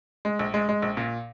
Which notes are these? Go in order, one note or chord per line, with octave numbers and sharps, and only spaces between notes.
G#3
A#1
G#3
G#3
A#1
A#2